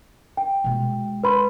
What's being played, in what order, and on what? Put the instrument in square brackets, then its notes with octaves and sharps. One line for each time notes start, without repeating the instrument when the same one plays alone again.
[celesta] G5
[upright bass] B2 G#3
[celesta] B4 B5 C6